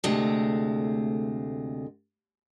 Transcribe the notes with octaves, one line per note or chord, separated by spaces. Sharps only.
D2 C3 G#3 A3